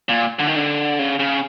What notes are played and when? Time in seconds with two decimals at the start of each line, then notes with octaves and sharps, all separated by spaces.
0.09 A#2
0.39 D3
0.47 D#3
0.56 D3
0.99 C#3
1.19 C#3